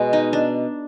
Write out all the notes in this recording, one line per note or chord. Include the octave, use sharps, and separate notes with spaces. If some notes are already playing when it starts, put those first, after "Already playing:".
Already playing: B2 G#3 B3
D#4
D4